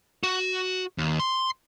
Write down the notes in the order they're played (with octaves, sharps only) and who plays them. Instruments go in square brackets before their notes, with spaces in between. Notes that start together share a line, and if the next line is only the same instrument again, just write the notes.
[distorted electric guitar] F#4
D#2
C6